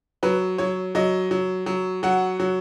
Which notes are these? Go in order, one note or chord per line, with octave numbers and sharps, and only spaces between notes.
F#3 B4
F#3 C#5
F#3 D#5
F#3
F#3
F#3 F#5
F#3